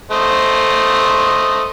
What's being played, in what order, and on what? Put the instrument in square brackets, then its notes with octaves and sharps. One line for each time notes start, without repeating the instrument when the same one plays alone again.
[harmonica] A3 C5 D#5